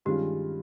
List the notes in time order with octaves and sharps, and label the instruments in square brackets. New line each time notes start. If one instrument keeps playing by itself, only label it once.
[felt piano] G2 D#3 G#3 C#4 F4 [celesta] G4